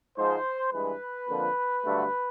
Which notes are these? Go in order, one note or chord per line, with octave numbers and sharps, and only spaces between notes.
G#2 F3 G#3 C5
G2 E3 G#3 B4
F2 D3 F3 A#3
G2 D3 F#3 A3